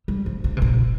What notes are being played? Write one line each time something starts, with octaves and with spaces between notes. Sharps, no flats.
G3
F3
D3
C3
A#2